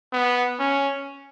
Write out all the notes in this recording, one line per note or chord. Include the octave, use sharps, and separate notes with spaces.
B3
C#4